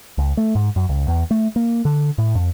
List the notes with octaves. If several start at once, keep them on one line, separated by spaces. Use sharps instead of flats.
C#2
A3
G#2
F#2
C#2
E2
A3
A#3
D3
A2
F2